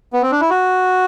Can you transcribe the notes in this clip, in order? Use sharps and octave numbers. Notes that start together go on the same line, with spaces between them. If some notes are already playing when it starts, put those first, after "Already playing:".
B3
C4
D4
E4
F#4